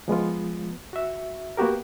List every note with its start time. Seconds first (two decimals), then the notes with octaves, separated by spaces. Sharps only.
0.08 F3 G#3 B3 F4
0.93 F#4 E5
1.57 A#3 B3 F#4 G4 A#4